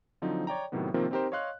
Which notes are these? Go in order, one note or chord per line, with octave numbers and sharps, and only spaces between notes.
D3 F3 F#3 C4 D#4
C#5 D5 G5 A#5
A2 C3 D#3 F#3 B3
C3 D#3 F3 A#3 C4 F4
C4 D#4 G4 A#4 C5
C#5 D#5 F5 C6 F#6